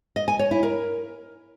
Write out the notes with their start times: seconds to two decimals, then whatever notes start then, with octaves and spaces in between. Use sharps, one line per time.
0.16 D#5
0.28 G#5
0.39 C#5
0.51 E4
0.63 A#4